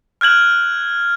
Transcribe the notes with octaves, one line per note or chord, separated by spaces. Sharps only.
F6 F#6 G#6 F#7